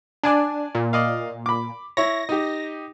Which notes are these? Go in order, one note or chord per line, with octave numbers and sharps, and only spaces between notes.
D4 D5 G#5 A5
A#2
D5 D#5 F5
B5 D6
E4 C#5 A#6
D#4 G4